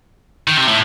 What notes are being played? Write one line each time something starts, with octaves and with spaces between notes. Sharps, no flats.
D#3
C3
A2